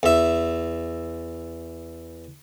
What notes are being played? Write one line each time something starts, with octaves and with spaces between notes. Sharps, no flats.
E2 E5